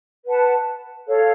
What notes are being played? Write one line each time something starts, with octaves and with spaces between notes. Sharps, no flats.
B4 F#5 A5
A4 C#5 F5